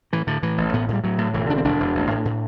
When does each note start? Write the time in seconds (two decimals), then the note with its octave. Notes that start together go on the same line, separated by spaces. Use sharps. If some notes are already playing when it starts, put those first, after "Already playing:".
0.13 A2 E3
0.27 A2 D3
0.43 A2 E3
0.58 A1
0.73 A2 B3
0.89 A2 G3
1.04 A2 F#3
1.18 A2
1.34 E1 E3
1.50 D3 D4
1.58 C4
1.64 E1 D4
1.80 E1
1.95 A1
2.11 A2
2.25 A2